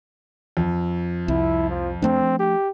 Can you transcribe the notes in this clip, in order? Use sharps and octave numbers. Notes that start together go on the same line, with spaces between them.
F2
C2 E4
F3
F3 A3 C4 D4
G4